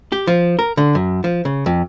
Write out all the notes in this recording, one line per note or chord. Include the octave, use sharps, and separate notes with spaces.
G4
F3
A#4
D3
F#2
F3
C#3
F2